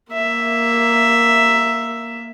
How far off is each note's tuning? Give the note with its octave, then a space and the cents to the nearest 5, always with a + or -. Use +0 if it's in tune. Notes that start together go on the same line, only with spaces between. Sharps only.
A#3 +0 E5 +5